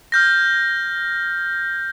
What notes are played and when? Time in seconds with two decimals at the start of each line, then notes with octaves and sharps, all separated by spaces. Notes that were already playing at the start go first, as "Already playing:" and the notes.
0.12 F6 G6 A#6